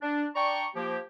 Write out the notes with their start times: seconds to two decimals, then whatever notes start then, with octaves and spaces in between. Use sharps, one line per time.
0.02 D4
0.35 D4 D5 G5 A#5 C#6
0.76 F3 A#3 G4